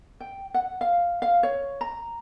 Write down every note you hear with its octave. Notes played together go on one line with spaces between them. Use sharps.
G5
F#5
F5
F5
C#5
A#5